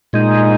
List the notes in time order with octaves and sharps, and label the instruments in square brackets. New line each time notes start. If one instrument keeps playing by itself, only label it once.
[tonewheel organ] A#2 G#3 D#4